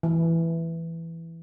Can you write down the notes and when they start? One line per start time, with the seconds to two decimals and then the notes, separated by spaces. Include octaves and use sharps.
0.03 E3